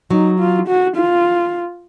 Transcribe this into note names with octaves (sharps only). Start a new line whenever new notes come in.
F#3 D#4
F4
F#4
F4